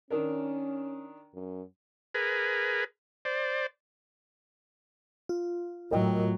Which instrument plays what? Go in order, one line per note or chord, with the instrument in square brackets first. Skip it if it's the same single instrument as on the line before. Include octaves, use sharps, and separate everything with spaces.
[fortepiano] D#3 D4 A#4 [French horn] C#4
[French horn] F#2
[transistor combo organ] G#4 A#4 B4
C5 D5
[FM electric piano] F4
[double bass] A2 F#3 [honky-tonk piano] A#4 D#5 G5